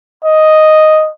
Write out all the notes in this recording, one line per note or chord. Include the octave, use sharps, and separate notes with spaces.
D#5